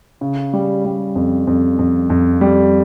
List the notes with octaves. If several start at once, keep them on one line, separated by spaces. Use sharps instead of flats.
C#3
G3
G3
F2
F2
F2
F2
G3